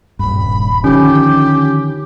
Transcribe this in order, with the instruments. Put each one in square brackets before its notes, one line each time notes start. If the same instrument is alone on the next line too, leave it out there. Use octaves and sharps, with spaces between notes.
[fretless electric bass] D#1 G2 [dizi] B5
[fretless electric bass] D3 D#3 F3 [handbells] C#4 [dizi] G4